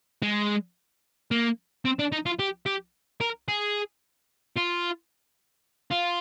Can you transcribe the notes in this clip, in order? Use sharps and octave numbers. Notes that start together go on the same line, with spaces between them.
G#3
A#3
C4
D4
D#4
F4
G4
G4
A#4
G#4
F4
F4